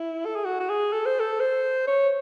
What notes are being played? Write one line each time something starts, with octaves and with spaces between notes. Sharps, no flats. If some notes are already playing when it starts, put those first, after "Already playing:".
Already playing: E4
A4
G#4
F#4
F#4
G#4
A4
C5
A4
C5
C#5